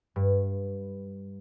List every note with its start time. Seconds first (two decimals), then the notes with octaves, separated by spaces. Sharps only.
0.16 G2